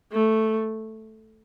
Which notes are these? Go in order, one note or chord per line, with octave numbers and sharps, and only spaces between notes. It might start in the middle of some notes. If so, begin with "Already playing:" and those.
A3